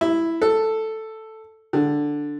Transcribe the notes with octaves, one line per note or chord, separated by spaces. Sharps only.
E4
A4
D3